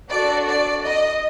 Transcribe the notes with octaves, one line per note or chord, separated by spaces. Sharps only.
D4 F#4 A4 D5
D5
D#5